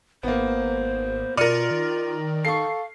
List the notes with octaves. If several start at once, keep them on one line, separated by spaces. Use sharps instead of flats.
G#1 A#3 B3 C5
B2 F4 A#4 D5 F6 C#7 D#7
D#3
A4 F5 C#6 C7